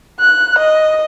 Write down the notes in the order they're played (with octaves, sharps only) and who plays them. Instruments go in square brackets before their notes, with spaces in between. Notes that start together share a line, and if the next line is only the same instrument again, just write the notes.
[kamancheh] F#6
D#5